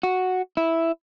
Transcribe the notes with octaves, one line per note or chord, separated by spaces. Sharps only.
F#4
E4